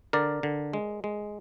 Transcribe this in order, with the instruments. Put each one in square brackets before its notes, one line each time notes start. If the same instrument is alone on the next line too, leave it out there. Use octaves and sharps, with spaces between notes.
[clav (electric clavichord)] D3 A#4 D5
D3
G#3
G#3